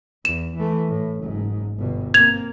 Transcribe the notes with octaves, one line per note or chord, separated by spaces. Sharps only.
E2 E7
E3 A3
A2
F#1 G#2
G1 B2
A#3 C4 G#6 F7